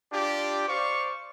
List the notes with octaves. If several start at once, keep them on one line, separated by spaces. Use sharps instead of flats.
D4 F4 G4
C5 D5 F5 C#6